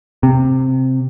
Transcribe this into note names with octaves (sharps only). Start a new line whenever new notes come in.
C3